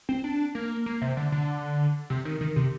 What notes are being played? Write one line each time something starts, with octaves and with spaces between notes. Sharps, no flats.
C4
D4
A#3
A#3
C3
D3
D3
C3
D#3
D#3
C3